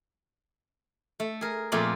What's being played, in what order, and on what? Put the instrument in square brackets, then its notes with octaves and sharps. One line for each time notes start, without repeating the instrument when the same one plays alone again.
[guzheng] A3
G#4 A#4
F2 A#2 A3 F4 G#4 D5